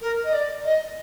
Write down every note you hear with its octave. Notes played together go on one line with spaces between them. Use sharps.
A#4
D#5
D5
D#5